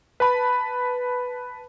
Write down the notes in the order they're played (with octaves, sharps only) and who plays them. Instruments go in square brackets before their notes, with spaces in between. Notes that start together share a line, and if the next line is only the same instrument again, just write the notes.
[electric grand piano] B4 A5 B5